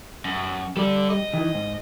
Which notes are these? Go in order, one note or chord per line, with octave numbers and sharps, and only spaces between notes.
F#2
G3 A4 D5
D#5
D#3 E3
G#2